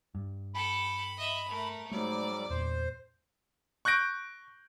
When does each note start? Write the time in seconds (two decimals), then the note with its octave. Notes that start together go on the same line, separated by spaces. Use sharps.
0.15 G2
0.55 A4 G5 B5
1.17 D#5 E5
1.48 A3 A#4
1.92 G#2 F#3 G3 A3 D5
2.50 E2 A#2 C5
3.85 C#6 F#6 G6 A#6 D7